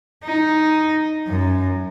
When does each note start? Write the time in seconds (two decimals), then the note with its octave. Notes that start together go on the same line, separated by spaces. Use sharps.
0.24 D#4
1.27 F#2